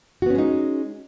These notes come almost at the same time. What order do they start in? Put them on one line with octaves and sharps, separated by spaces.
F#4 B3 C#4 G#3 D#4